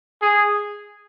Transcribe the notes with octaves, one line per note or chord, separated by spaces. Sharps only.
G#4